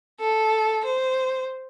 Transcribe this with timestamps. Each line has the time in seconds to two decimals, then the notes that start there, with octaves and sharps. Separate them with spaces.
0.20 A4
0.85 C5